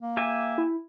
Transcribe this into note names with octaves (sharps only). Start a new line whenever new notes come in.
A#3
G4 E5 G#5
E4